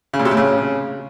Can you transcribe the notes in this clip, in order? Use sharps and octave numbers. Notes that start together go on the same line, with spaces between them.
C#3
A#2
C3
A2
C#3